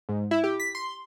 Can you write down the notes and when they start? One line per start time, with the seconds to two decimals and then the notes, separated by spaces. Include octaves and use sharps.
0.09 G#2
0.31 E4
0.44 G4
0.60 B6
0.75 C6